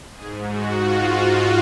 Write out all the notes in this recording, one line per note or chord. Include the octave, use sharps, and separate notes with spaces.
G#2 G#4
F#4
F4
F4